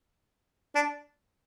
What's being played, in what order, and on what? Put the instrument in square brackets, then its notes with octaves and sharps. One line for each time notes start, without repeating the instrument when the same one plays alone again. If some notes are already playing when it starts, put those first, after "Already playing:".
[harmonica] D4